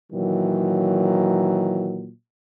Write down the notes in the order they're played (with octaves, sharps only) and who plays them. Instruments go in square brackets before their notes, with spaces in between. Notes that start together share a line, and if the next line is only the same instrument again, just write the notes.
[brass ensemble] A#2 D#3 E3 F#3